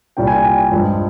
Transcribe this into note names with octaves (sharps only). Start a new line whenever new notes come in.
C2 A#2 G3 G5
G#5
G5
G2 F3 G#3